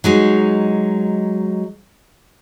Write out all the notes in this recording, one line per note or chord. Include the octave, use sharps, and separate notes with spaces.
F#3 G#3 D#4